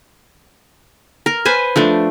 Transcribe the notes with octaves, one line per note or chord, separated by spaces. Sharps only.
A#4
B4 C5 G#5
F3 A3 D4